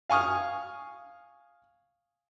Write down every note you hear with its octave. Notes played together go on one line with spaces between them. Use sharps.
F5 G#5 C#6 D#6 F6